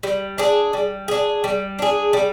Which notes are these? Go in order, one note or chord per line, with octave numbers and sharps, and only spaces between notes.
G3
D4 G#4
G3
D4 G#4
G3
D4 G#4
G3